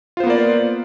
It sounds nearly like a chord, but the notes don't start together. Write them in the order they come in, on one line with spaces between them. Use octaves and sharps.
F4 C5 B3 A#3 D5